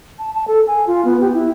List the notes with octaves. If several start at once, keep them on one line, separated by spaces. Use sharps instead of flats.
A5
A5
A4
G#5
F4
B3
G4
E4